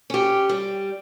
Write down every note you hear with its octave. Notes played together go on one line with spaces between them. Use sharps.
C#4 G4
G3